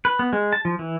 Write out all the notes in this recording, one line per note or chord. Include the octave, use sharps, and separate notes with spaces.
B4
B3
G#3
A5
F3
E3